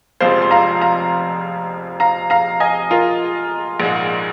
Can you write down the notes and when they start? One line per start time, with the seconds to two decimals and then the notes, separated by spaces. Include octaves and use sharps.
0.21 F1 F2 F3 G#3 C5 F5
0.42 C6
0.51 F5 A#5
0.81 F5 A#5
2.00 F5 A#5
2.30 F5 A#5
2.60 D#5 G#5
2.91 F4 A#4
3.80 A#1 G#2 G#3